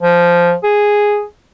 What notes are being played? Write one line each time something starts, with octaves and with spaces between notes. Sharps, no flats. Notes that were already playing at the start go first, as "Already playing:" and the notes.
F3
G#4